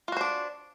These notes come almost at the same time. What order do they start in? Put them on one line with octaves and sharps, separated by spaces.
F4 F#4 C5 D4